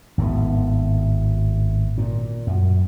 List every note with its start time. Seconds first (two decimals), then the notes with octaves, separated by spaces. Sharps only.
0.18 G#1 A2 D#3 B3
1.98 A#2
2.47 F#2